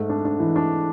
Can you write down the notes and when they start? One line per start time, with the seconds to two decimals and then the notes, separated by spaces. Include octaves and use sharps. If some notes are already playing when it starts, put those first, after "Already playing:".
Already playing: G#2 A3
0.09 D4
0.25 D4
0.40 E3
0.56 D4